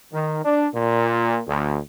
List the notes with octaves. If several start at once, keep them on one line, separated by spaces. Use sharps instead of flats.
D#3
D4
A#2
D2